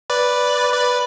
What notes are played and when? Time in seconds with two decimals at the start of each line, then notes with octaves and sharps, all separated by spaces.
0.10 B4 D5
0.73 B4 D5